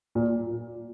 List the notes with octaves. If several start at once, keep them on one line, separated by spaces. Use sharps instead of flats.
A#2